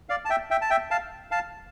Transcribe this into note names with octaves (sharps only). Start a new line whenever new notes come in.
D5 F5
A5
E5 G5
E5 G5
A5
E5 G5
F5 A5
F5 A5